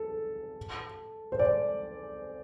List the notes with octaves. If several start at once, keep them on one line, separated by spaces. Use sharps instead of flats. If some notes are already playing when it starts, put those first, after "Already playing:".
Already playing: A4
C5
D5